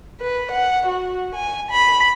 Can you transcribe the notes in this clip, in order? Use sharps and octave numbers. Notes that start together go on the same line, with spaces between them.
B4
F#5
F#4
G#5
B5